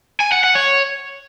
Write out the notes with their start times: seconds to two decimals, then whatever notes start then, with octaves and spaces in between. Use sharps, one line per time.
0.20 G#5
0.32 F#5
0.44 F#5
0.55 C#5